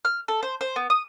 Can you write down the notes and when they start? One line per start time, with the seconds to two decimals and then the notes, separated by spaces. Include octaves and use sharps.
0.05 F6
0.28 A4
0.43 C5
0.61 C5
0.76 B3
0.90 D#6